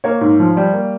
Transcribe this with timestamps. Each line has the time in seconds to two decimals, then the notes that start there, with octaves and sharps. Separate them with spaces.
0.04 A#3 C#5
0.21 G#2
0.40 F3
0.57 G3
0.73 A#3